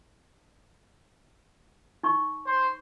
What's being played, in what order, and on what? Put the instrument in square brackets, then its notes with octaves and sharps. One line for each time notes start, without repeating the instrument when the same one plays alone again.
[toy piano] D#4 C#6
[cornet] C5